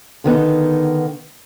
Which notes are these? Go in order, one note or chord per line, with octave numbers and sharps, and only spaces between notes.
D3 D#3 B3 D#4